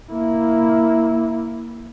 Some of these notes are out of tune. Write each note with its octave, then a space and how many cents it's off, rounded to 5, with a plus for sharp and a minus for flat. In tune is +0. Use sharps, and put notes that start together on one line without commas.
A#3 +0 E4 -5